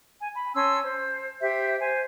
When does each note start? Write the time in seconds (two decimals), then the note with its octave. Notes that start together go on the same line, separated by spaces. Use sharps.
0.20 G#5
0.35 B5
0.54 C#4 A5 C6 E6
0.83 C5
1.41 G4 C5 E5
1.81 C5 G#5